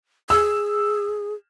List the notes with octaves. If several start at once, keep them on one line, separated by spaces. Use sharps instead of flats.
G#4 E6